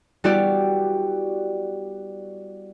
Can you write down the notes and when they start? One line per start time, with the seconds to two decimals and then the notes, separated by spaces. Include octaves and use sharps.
0.24 G3 B3 E4 F#4 G4 D5